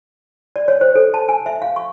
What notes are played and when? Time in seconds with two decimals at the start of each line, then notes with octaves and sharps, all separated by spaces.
0.56 D5
0.68 C#5
0.81 C5
0.95 A4
1.14 A5
1.29 G#5
1.46 E5
1.62 F5
1.76 C#6